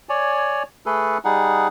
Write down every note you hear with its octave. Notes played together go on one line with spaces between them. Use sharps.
C#5 D5 G#5
A3 G#4 A4 B4
G3 D#4 G#4 F#5